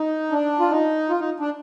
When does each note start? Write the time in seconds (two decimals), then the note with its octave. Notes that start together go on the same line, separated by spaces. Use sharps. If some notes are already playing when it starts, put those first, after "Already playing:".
Already playing: D#4
0.32 D4
0.60 F4
0.70 D#4
1.10 F4
1.20 D#4
1.40 D4